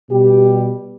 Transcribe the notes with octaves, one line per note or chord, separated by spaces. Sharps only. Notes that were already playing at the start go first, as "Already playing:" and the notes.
B2 G3 G4